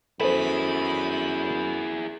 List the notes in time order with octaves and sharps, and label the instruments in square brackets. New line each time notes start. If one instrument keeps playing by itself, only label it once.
[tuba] F#2 [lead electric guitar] E4 G#4 [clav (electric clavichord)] A4 B4 C5 [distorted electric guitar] B5